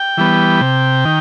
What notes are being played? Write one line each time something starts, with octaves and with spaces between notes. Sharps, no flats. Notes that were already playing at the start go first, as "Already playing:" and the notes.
Already playing: G5
E3 G3 B3
C3
D#3